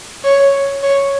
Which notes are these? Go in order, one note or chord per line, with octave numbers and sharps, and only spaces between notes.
C#5
C#5